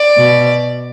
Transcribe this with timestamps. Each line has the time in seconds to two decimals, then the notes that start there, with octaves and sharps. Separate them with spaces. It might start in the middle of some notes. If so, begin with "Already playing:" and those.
Already playing: D5
0.17 B2